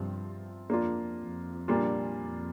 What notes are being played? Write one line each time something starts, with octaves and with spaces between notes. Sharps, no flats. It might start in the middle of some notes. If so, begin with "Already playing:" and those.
Already playing: G2 C3 F3 C4 F4
F2 A#3 D4 F4
F2
A#2 G3 A#3 D4 F4
F2